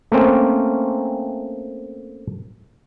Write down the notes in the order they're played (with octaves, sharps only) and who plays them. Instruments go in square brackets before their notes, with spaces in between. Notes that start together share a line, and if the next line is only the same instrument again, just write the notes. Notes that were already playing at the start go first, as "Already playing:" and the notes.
[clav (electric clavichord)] A3 A#3 C4 C#4